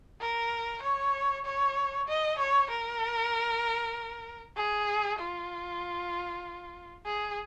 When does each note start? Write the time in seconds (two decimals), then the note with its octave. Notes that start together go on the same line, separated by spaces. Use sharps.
0.21 A#4
0.82 C#5
1.45 C#5
2.08 D#5
2.38 C#5
2.70 A#4
4.56 G#4
5.19 F4
7.06 G#4